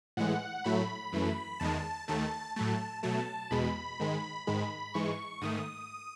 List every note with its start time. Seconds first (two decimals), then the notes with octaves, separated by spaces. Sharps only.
0.17 A2 E3 G#3 F#5
0.64 A2 F#3 A3 B5
1.13 F#2 E3 A3
1.60 E2 D#3 G#3 A5
2.08 D#2 D#3 A3 A5
2.56 A2 F#3 A3 A5
3.03 B2 F#3 A3 A5
3.51 E2 B2 G#3 B5
4.00 G#2 D#3 G#3
4.47 G#2 D#3 G#3 B5
4.94 G#2 E3 G#3 C#6
5.41 G#2 D#3 A3 D#6